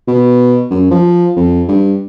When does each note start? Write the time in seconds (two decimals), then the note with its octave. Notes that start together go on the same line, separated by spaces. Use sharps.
0.08 B2
0.71 F#2
0.91 F3
1.36 F2
1.68 G2